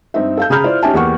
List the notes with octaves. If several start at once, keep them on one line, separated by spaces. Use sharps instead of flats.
G2 C4 D#4 E5
A4 F5 G6
C#3 G#4 A#5 B5 F6 G6
E4 F4 C5 D5
C#4 D#4 G4 E5 G#5 A5
E2 A#3 G4 F#5 C#6